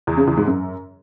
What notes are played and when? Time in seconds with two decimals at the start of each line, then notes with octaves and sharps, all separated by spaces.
0.07 E2
0.17 C#3
0.27 E2
0.37 G#2
0.47 F#2